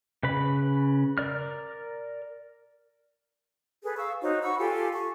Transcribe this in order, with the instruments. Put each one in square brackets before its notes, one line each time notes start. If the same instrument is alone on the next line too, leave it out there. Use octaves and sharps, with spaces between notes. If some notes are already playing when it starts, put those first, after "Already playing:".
[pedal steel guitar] C#3 B4 B5
A#4 D5 F6
[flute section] G#4 A4 B4
F5 C#6 E6
D#4 F#4 C5 C#5
F#5 B5 C#6 E6
F4 G4 A4 G#5
C#6